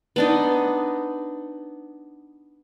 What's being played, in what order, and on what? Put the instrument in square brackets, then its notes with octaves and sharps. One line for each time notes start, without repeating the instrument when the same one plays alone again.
[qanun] B3 D4 D#4